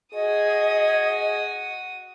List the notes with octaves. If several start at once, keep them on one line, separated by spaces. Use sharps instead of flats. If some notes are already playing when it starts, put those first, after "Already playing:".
F#4 G#4 D#5 D#6